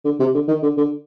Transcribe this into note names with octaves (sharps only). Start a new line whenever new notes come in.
D3
C3
D3
D#3
D3
D3